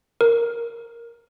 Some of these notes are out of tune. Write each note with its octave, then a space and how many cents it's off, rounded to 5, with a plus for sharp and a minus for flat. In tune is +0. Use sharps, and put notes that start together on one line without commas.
A#4 +0